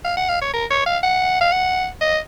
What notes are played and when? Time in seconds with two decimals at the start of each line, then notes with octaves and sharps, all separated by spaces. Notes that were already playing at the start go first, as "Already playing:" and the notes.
0.05 F5
0.17 F#5
0.29 F5
0.41 C#5
0.53 A#4
0.70 C#5
0.86 F5
1.03 F#5
1.41 F5
1.52 F#5
2.01 D#5